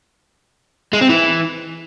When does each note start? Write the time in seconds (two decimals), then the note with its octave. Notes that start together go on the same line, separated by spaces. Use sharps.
0.93 G#3
1.01 C4
1.10 E3